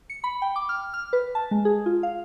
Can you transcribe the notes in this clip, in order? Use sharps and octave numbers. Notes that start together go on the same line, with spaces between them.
C#7
B5
G5
D6
F6
F6
B4
A5
G#3
G#4
F4
F5